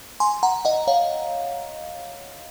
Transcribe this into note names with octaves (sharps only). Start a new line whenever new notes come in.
G#5 C6
F#5 A#5
D#5 F#5
C#5 F5